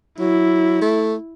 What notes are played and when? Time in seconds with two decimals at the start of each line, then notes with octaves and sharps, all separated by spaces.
0.20 F#3 E4
0.82 A3